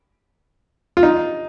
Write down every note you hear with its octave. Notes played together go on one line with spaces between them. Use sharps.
F4
D#4